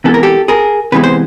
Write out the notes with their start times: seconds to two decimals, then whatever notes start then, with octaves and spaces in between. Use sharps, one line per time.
0.04 C3 E3 G#3 B3 A4
0.14 A#4
0.23 G4 A4
0.48 G#4 A#4
0.92 C3 E3 G#3 B3 B4
1.04 C5